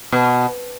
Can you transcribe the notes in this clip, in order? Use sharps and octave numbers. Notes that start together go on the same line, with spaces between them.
B2